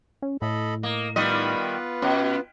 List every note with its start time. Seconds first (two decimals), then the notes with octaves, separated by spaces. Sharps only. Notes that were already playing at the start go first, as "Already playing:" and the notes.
0.22 C#4
0.42 A2 A4 D#5 B5
0.83 A#3 D#5
1.16 D#3 G3 B3 F4 B4 D#5
2.02 B2 C#4